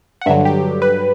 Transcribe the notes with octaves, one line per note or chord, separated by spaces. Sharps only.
F#5
G2 D3 F#3 E5
G4
B4